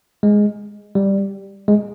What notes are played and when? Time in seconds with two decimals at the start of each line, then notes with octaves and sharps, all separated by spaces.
0.23 G#3
0.95 G3
1.68 G#3